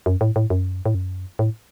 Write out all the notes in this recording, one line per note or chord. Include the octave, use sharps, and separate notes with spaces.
F#2
A2
A2
F#2
A2
F#2
A2